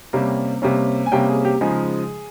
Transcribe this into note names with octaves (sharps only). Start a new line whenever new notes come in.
C3 G3 A#3 C#4
C3 G3 A#3 C#4
G#5
C3 G3 A#3 C#4 G5
G#4
G4
C#3 F3 G#3 D#4 G#4